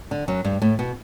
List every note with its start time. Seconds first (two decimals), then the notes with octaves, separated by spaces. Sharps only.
0.11 D3
0.28 F#2 F#3
0.44 G2 G3
0.62 A2 A3
0.79 B2 B3